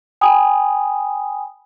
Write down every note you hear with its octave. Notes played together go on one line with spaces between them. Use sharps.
G5 G#5 B5 D#6